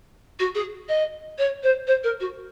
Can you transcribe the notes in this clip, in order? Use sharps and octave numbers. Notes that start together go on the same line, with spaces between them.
F#4
G#4
D#5
C#5
C5
C5
A#4
F#4